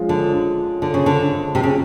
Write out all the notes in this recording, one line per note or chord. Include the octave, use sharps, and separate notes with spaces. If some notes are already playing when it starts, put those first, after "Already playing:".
Already playing: F3 G#3 C#4 F4
D3
D3
C#3
D3
C3
C#3